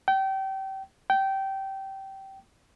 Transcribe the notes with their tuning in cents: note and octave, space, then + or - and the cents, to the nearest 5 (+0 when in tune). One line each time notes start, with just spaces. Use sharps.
G5 -30
G5 -20